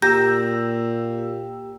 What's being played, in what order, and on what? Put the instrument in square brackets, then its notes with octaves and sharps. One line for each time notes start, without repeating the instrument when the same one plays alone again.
[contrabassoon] A#2 [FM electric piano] G4 G5 E6 [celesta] A#5 A#6 [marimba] G6